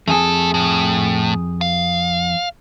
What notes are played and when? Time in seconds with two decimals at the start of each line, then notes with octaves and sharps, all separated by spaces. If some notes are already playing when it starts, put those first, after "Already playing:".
0.08 F2 A3 G#4 A4 G#5
0.54 A2
1.61 F5